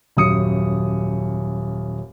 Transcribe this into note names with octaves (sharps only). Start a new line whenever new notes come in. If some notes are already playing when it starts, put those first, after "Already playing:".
D#1 F#2 D#6 C#7